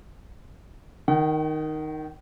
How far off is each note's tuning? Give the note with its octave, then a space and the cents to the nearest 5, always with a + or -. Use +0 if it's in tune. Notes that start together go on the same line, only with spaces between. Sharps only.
D#3 +0 F#5 +45